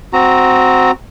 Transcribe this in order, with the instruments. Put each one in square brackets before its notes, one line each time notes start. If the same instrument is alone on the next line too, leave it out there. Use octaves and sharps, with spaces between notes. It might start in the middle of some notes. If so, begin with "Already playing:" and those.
[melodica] C4 F#4 A#5